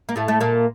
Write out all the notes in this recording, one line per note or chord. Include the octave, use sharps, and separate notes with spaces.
A#3
A2 A3
A3
A#2 A#3